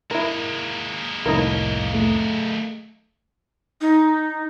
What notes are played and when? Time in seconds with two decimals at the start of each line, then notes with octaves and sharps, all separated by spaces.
0.11 G#3 A#3 E4 A#4
1.26 C2 F2 A2 D#4 E4 A#4
1.94 A3
3.81 D#4